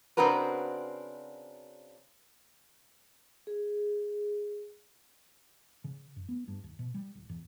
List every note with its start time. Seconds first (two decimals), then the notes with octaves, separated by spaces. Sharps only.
0.17 C#3 C4 D4 F#4 A#4 B4
3.47 G#4
5.84 C#3
6.16 F#2
6.29 B3
6.48 G2
6.64 D#2
6.79 B2
6.94 G3
7.15 D1
7.29 E2